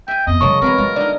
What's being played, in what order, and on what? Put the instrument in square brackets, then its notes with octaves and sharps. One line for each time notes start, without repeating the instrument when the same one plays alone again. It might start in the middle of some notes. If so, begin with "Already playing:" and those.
[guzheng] E5 G#5 [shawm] G5
[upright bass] F2 B3 [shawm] D#5
[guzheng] E2 A#3 A5 [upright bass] C#3 F#3 [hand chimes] C#5 C#6
[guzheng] F#3 G#3 B3 [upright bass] C4 [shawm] A#4
[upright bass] G3 [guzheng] F4
[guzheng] D3 D#4 [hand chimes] D5